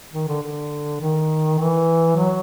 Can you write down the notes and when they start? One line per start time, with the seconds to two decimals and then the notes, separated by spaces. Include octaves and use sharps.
0.13 D#3
0.28 D3
0.42 D3
1.01 D#3
1.58 E3
2.16 F#3